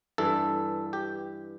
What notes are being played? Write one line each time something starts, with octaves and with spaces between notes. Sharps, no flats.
G2 E3 A4
G4